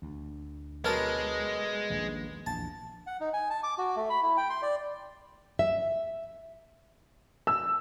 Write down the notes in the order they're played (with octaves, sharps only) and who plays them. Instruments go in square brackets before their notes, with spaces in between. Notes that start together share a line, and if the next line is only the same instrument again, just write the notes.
[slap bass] D2
[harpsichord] B1 A#4 A5 [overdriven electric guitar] G#3
[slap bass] D#1 A#1
[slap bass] A#1 E2 [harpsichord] A5
[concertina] F#5
D#4
G#5
A5
D6
F#4
A3
B5
E4
G5
C6
D5
[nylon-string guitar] E5
[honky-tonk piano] E6